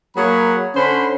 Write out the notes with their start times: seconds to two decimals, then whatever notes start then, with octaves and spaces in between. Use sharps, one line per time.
0.16 F#3 A#3 G#4 C#5 F#5 B5
0.75 D3 C#4 C5 B5